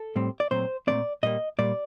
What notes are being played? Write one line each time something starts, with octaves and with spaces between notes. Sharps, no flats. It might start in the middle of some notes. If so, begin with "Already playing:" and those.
Already playing: A4
A2 G3 C4
D5
A#2 F#3 A3 C4 C5
A#2 F#3 A3 C4 D5
A#2 G3 A#3 D#5
A#2 G3 A#3 D5